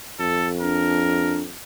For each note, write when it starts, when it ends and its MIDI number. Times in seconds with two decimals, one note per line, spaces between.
0.19 1.55 41
0.19 0.48 69
0.61 1.41 62
0.61 1.39 70